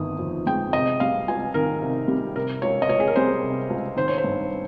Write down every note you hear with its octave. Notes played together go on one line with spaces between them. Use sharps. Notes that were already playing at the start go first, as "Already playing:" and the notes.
Already playing: G1 D#3 D#6
F2
G#3 G5
C3 D#5
G3 F5
C#2 G#5
D#3 A#4
C3
G3
C3 A#4
C#2 C#5
D#5
C#2 C#5
G#4
A#4
G3 C5
C3
C#2
D#3 C5
C#5
C5
G2